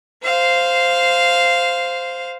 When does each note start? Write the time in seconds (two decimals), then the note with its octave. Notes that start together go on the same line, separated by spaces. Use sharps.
0.24 C5 F5